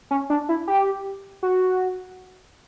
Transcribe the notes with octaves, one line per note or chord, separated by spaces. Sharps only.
C#4
D4
E4
G4
F#4